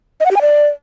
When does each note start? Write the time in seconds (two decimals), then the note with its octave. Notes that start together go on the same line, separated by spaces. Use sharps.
0.20 D#5
0.26 F#5
0.31 G4
0.36 G#5
0.41 D5